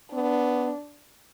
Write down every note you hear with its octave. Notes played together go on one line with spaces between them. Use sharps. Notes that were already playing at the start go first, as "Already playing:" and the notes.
B3 D4